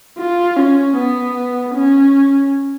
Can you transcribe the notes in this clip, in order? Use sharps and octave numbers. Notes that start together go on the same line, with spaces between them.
F4
C#4
B3
C#4